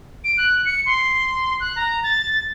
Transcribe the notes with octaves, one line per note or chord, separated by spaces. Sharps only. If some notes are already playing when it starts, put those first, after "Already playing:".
D7
F#6
C#7
C6
F#6
A#5
A6